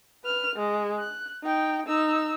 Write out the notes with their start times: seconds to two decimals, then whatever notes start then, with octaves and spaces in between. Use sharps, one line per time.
0.24 B4 F6
0.56 G#3
0.99 F#6
1.43 D#4 G5
1.86 D#4 E6